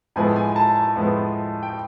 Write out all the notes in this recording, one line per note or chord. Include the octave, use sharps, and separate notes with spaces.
A2 F3 G#3 B3 G#5
G#5
G#5
A5
A5
A2 F3 G#3 B3
G5